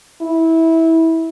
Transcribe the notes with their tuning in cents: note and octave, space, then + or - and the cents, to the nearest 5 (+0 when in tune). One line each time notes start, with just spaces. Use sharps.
E4 -20